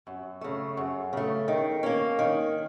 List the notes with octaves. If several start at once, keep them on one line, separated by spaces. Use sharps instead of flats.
F#2
C#3 A3
F#2
C#3 A3
D#3
A#3 C#4
D#3